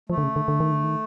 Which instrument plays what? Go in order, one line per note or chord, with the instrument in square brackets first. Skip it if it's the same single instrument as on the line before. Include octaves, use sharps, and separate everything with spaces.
[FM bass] F3 [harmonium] A3
[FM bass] D3
C#3
D3
D3
D#3
D3
D#3